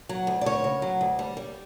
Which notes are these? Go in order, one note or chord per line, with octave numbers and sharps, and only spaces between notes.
F#3
D2
D5
D2 C#5
C#3
F#3
D2
G3
G3